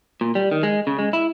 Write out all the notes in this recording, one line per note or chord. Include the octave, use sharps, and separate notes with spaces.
A#2
G3
D#3
G#3
C#3
G#3
E4